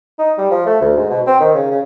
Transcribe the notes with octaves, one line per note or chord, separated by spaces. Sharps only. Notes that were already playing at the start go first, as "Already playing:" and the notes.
D#4
G3
F3
A3
D2
G#2
B2
C4
D#3
C#3
C#3